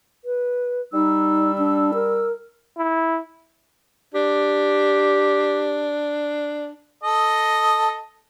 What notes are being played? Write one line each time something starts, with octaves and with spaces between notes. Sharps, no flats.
B4
G3 D#4 E6
D4
A#4
E4
D4 G4
A4 D#5